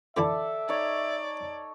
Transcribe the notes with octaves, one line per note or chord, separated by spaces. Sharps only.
D3 E3 E4 A4 D5 E5
D#4 C#5 D5